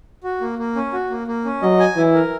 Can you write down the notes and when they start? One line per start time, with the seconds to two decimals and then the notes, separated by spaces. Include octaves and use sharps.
0.24 F#4
0.41 A#3
0.59 A#3
0.76 C#4
0.93 F#4
1.10 A#3
1.27 A#3
1.45 C#4
1.62 F#3 D#5
1.80 G#5
1.97 E3 E4
2.14 A#4